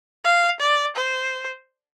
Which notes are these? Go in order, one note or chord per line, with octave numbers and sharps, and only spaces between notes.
F5
D5
C5